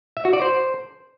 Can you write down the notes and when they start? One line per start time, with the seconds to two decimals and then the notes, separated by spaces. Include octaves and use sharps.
0.17 E5
0.25 F#4
0.33 D5
0.42 C5